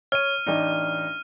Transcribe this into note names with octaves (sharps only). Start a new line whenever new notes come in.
C#5 F6 D#7
A1 D4 D#4